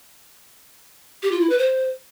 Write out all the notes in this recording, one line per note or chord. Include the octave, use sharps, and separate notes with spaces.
G4
F4
E4
B4
C5